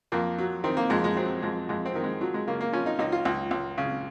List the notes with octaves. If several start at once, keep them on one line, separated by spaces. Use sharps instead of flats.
F2 A#3
F#3
D#3 C4
A#3
F2 G#3
G#3
F#3 C4
F2 G#3
F2 G#3
C4
D#3
G#3
F3 F#3
G#3
C#3 A#3
A#3
F3 C#4
D#4
C#2 D#4
F4
C#2
C#2
C#3